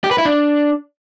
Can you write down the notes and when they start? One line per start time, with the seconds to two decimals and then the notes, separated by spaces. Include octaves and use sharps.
0.04 G4
0.11 B4
0.18 E4
0.25 D4